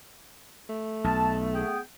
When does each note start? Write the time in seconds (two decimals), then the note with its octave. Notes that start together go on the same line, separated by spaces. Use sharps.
0.69 A3
1.04 B1 A5
1.53 B3 G#4 G5